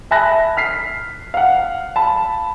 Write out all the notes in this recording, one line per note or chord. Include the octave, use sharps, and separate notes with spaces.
E5 G#5 A5 B5 F#6 A#6
F6 B6 C7
F5 F#5
A5 B5